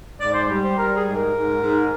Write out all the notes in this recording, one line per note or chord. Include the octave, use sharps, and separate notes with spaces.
G#2 D5
C5
G3
C5
G3 A#4
G#4
G#2
A#4
G#2
G#2